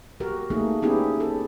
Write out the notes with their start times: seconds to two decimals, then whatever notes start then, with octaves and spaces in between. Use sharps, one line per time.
0.20 F#4 G4 A#4
0.50 A3 A#3 D#4 G#4
0.82 B3 C#4 D#4 E4 G4 G#4
1.20 A4